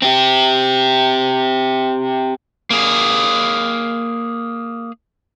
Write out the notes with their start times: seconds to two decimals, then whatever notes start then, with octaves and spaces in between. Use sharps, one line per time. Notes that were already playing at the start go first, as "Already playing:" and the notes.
0.02 C4 G4
2.70 A#3 G#4